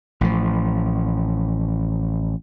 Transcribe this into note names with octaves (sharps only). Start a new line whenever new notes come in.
A1 A2 F3